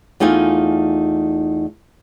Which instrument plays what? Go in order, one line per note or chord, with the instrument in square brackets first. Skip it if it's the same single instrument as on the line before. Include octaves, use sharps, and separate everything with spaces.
[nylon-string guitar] E2 A3 D#4 F4 G#5